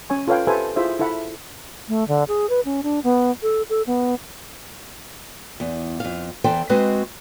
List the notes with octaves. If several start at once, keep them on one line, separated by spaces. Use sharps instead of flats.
C#4 C#5 G#5 C#6
F4 A4 B4 C#5 F5 G5
G4 A4 B4 C5 E5 G#5
E4 F4 G#4 C5 E5
E4 A4 E5 F#5 B5
A3
D3
G#4
B4
C#4
D4
B3
A4
A4
B3
E2
F2 F5
E2 E3 A4 C5 G5
G#3 C4 F#4 B4 D#5